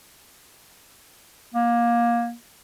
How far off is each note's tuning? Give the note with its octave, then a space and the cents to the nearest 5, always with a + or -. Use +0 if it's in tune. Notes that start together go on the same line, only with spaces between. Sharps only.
A#3 +20